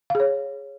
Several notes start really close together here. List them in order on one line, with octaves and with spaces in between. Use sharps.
F5 G#4 C#5